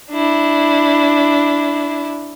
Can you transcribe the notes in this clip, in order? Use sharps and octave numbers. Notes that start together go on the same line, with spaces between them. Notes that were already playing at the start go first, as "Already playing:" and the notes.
D4 E4